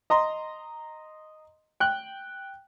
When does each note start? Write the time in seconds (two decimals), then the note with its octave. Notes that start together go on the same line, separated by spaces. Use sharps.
0.10 D#5 A#5 C6
1.80 G5 F#6